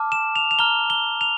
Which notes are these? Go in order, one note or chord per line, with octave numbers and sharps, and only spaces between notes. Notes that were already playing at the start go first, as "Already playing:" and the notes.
Already playing: A5 D6 F6
E7
F7
F7
A#5 F6 G7
G7
F7